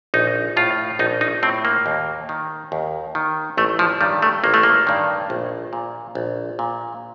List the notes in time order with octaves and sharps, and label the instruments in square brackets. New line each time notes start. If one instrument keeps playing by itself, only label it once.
[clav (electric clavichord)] A#1 D#4
A2 F4
A#1 D#4
D#4
A2 C4
A#3
D#2
D#3
D#2
D#3
A1 A3
F3
G2 D#3 G3
A3
A1 A#3
A3
A#3
G2 D#3
A#1
A#2
A#1
A#2